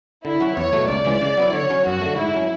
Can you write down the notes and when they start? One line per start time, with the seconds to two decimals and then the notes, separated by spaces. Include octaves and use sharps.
0.25 D3 E4
0.40 F#3 C#4 F#4
0.57 E2 C#5
0.73 B2 F#3 A3
0.88 C#2 D5
1.05 C#3 E3 G#3
1.21 C#3
1.37 F#3 B3 E4
1.53 D3 C#5
1.70 F#3 C#4
1.85 F#2 F#4
2.01 D3 A3
2.17 G#2 E4
2.34 F#3 C#4